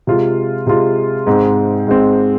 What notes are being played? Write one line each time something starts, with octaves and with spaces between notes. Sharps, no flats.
C3 G#3 F4
C3 G#3 F4
G#2 G#3 C4
G#2 G#3 C4